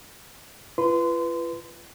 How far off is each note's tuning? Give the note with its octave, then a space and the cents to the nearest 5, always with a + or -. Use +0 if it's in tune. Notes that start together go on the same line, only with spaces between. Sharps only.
F4 -35 B4 +0 C6 -25